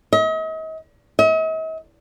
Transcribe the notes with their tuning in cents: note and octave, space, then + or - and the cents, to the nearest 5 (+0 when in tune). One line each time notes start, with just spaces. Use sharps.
D#5 +40
D#5 +45